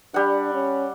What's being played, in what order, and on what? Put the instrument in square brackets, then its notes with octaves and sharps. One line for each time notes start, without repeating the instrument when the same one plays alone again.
[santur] G3 F#5 [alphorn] D4
[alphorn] C#4